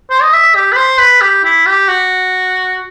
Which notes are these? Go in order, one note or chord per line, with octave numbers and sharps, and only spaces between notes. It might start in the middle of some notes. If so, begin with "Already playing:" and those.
C5
D#5
E5
G4
B4
C5
B4
G4
E4
G4
F#4